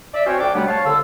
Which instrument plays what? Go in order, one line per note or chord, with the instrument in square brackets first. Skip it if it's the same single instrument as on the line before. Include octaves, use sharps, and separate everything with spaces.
[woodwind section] D5 E5
C4 C#4 F#4 C5 C#5 G5
D2 D4 G5 D6
C3 F#3 G3 A3 B3 D4
C#5 F5 A5
C2 D3 E6